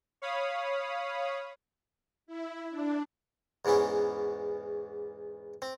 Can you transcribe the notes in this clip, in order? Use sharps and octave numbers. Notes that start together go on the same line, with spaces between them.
C#5 F5 B5 D#6
E4
D4
E2 G#2 E3 B3 C#4
C4